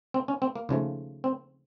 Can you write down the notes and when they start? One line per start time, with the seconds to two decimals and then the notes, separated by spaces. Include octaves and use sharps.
0.14 C4
0.28 C#4
0.42 C4
0.55 A#3
0.69 D#2 C#3 F3 A3
1.24 C4